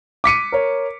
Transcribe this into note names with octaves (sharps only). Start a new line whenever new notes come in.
D6 B6 C#7 D#7
A#4 C#5